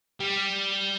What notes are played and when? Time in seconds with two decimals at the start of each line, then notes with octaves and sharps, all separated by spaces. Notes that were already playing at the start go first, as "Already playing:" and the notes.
0.20 G3